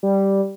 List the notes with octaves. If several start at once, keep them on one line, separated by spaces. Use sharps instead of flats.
G3